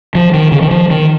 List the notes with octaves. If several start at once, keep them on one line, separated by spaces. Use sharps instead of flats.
F3
D#3
C#3
D#3
F3
D#3